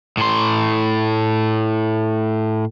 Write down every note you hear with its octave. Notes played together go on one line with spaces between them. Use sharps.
A2 C6